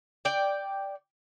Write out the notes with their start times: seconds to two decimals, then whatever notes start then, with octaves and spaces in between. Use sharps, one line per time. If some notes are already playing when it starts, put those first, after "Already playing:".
0.25 D5 G5